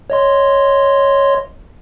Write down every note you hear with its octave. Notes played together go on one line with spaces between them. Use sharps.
C#5 D#5 C6